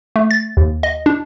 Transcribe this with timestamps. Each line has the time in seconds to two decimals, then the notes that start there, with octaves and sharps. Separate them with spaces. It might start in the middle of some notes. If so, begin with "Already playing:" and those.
0.16 A3
0.31 A6
0.57 D#2
0.83 D#5
1.06 D4